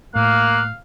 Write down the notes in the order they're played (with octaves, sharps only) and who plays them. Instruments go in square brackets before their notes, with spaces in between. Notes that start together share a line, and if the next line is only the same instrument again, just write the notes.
[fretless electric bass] A2 [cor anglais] A#3 [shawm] F5 [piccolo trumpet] F#6